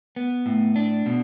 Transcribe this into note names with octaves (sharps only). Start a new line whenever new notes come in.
B3
A2
D4
B2